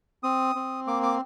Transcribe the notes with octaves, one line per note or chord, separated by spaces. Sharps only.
C4 D#6
C4
A#3 D6
D6